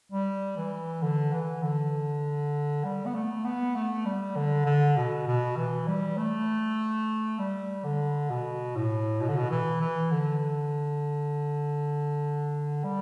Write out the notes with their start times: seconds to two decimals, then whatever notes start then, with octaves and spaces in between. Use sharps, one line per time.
0.12 G3
0.57 E3
1.02 D3
1.32 E3
1.63 D3
2.84 G3
3.06 B3
3.14 A3
3.45 B3
3.75 A3
4.05 G3
4.36 D3
4.66 D3
4.96 B2
5.27 B2
5.57 E3
5.88 G3
6.17 A3
7.39 G3
7.84 D3
8.30 B2
8.76 A2
9.21 B2
9.29 D3
9.36 B2
9.50 E3
9.81 E3
10.11 D3
12.84 G3